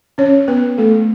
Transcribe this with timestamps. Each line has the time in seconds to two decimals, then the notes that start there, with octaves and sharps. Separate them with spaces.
0.18 C#4 C#5
0.48 B3 B4
0.78 A3 A4